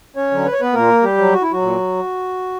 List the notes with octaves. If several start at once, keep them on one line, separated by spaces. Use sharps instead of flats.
C#4 C#5
D3 F#3
B4
C#5
B3 B4
A#2 A#3 A#4
G3 G4
F#3
F#4
E4
F#3 F#4
A#2